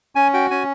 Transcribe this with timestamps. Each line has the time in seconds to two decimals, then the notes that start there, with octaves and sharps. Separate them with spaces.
0.15 C#4 G#5
0.33 F#4 G5
0.51 C#4 G#5